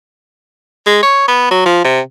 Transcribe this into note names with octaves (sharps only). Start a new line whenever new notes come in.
G#3
C#5
B3
F#3
F3
C3